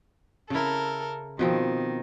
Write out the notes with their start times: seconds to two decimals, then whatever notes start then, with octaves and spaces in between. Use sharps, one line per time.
0.50 C#3 E4 A4 A#4
1.39 B2 D#3 F3 C4